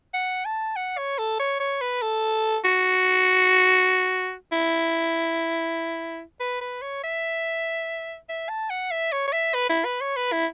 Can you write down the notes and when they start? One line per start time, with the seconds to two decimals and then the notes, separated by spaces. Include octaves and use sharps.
0.14 F#5
0.45 A5
0.76 F#5
0.97 C#5
1.19 A4
1.39 C#5
1.60 C#5
1.81 B4
2.02 A4
2.65 F#4
4.52 E4
6.40 B4
6.61 B4
6.81 C#5
7.03 E5
8.29 E5
8.49 A5
8.70 F#5
8.91 E5
9.12 C#5
9.27 C#5
9.32 E5
9.54 B4
9.69 E4
9.85 B4
10.01 C#5
10.16 B4
10.32 E4